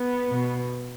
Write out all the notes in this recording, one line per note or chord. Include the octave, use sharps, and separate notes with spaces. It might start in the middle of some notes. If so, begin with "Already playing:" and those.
Already playing: B3
B2